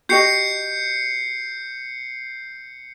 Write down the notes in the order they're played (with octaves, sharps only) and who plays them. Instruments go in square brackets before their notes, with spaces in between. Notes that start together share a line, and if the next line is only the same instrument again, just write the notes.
[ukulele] F#4 G4 D#5 [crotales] G6 C7 C#7